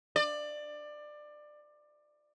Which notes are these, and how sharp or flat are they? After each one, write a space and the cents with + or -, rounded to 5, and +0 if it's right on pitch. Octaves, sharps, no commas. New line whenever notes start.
D5 +20